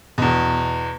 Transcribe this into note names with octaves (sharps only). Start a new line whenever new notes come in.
E2 B2